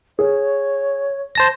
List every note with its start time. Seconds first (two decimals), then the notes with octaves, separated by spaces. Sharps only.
0.19 G#4 C#5
1.35 C5 A5 A#6